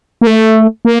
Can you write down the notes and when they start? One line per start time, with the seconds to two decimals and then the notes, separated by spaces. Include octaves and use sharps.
0.21 A#3
0.27 A3
0.85 A#3